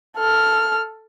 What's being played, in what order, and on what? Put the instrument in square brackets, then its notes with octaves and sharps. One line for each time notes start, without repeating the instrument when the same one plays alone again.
[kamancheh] A4 F6